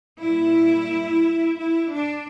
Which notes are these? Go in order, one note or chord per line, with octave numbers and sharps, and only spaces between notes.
A#2 G3 E4
E4
D4